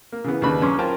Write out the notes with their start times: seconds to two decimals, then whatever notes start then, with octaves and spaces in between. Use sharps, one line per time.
0.12 A#3
0.24 C#3 E3 B3
0.42 D#2 C#3 D4 B4 B5
0.62 F#2 C#4 A#5 C6 D6
0.78 C#4 F4 A#4 C5 G5 A5